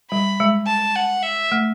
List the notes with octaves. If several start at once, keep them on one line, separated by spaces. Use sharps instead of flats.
G3 B5
G#3
A5
F#5
E5
A3